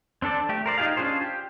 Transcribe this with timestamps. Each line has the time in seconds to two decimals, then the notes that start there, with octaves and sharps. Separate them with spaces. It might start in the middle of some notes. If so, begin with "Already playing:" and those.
0.22 C4 D4 A4 D5
0.49 A3 G4
0.66 A#4 C5 D5
0.78 D#4 F4 G4 G#4 F5
0.97 C#4 D4 F4 G#4 C5
1.21 G4